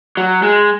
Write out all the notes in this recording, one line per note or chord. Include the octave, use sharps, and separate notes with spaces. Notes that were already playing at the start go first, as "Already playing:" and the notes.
F#3
G#3